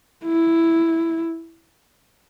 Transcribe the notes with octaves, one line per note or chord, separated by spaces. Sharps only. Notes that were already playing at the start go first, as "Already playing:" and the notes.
E4